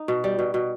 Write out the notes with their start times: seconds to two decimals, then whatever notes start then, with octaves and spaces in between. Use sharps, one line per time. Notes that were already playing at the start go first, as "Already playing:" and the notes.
Already playing: D#4
0.08 B2
0.24 G3
0.39 B2
0.54 B2